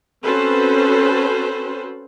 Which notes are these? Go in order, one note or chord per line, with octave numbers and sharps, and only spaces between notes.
C4 C#4 F#4 A4 B4 C5